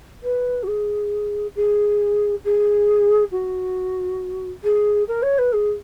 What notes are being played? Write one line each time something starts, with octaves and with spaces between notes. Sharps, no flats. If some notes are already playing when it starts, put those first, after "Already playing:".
B4
F#4
G#4
G#4
G#4
F#4
G#4
A#4
C#5
B4
G#4